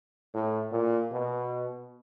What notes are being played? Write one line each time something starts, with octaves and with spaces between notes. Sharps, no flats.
A2
A#2
B2